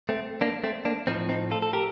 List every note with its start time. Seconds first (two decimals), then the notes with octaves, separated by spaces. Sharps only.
0.09 A3 C4
0.41 A#3 D4
0.64 A3 C4
0.85 A#3 D4
1.07 A2 F3 C4 D#4
1.29 C4 D#4
1.51 F4 A4
1.62 A4
1.73 G4 A#4